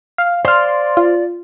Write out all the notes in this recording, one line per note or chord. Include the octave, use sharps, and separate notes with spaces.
F5
C5 D5 F5 C6
F4